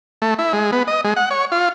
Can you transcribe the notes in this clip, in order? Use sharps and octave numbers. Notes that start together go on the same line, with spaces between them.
A3
E4
G#3
B3
D#5
G#3
F#5
C#5
F4